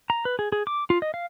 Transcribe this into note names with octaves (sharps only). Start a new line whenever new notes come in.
A#5
B4
G#4
G#4
D6
F4
D#5
F5